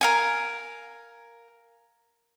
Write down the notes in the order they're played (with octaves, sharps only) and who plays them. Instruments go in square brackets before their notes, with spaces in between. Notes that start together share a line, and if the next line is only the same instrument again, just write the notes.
[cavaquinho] A#4 F5 G#5